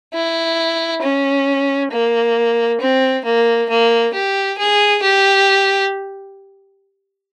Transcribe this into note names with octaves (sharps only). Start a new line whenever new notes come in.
E4
C#4
A#3
C4
A#3
A#3
G4
G#4
G4